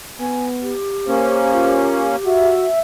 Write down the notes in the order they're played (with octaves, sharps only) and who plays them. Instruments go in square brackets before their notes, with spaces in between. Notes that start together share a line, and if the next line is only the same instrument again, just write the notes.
[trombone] B3 [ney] G#5
[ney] G4
[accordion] A#3 C#4 [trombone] C5
[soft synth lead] F4
[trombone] F#4 [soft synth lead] E5